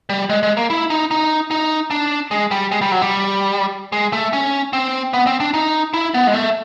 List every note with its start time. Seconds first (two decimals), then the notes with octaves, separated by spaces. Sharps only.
0.10 G3
0.30 G#3
0.43 G#3
0.57 A#3
0.70 E4
0.90 D#4
1.11 D#4
1.51 D#4
1.91 D4
2.31 G#3
2.51 G3
2.72 G#3
2.81 G3
2.92 F#3
3.02 G3
3.92 G#3
4.13 A3
4.33 C#4
4.73 C4
5.13 B3
5.27 C4
5.40 D4
5.54 D#4
5.94 E4
6.14 B3
6.27 G#3
6.34 A3